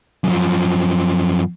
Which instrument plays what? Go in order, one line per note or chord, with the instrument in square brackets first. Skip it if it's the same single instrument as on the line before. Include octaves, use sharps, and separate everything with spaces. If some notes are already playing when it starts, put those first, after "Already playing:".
[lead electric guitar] F#2 F3